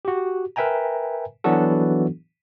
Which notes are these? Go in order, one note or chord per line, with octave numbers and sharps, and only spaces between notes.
F#4 G4
A#4 B4 E5 G5 G#5 A#5
E3 F#3 B3 D4 F#4 A4